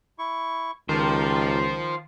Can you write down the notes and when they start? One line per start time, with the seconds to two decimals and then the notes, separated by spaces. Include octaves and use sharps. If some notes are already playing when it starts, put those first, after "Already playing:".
0.19 E4 C#6
0.89 C#2 D#3 F4 G4 A#4 C5 A5